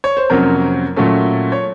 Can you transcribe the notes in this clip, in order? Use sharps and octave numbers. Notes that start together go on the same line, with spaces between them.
C#5
C5
F2 C3 F#3 A#3 C#4 A#4
A#2 F#3 A3 C#4
C#5